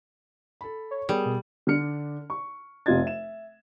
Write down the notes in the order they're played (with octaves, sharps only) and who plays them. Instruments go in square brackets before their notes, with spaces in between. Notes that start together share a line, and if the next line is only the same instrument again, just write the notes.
[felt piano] A4 B5
[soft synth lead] C#5
[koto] G3 [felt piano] B3 G#4 A#4
[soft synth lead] B2
[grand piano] D3 D4 F6 C#7
C#6
F1 C3 F4 D#5 G#6 A6
E5 E7